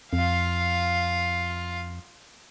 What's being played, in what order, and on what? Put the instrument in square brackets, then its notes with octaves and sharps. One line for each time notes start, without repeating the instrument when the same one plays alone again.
[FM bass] F2 [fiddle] F4 F5